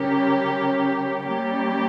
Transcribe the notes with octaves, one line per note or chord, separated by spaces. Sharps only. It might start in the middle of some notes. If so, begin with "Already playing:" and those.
Already playing: C#3 G3 C#4 G4 A#4
G3 A#3 C#4 G4